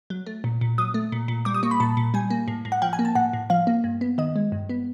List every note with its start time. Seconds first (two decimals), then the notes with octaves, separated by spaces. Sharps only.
0.10 F#3
0.26 A3
0.44 A#2
0.61 A#2
0.78 F#3 D#6
0.94 A3
1.12 A#2
1.28 A#2
1.45 G3 D6
1.54 D#6
1.63 A#3 C#6
1.71 B5
1.80 A#2 A5
1.97 A#2
2.14 G3 G#5
2.30 A#3
2.48 A2
2.65 A2
2.72 F#5
2.82 F3 G5
2.93 G#5
2.99 A#3
3.05 A5
3.15 A2 F#5
3.33 A2
3.50 F3 F5
3.67 A#3
3.84 G2
4.01 B3
4.18 D#3 D#5
4.36 G#3
4.52 G2
4.69 B3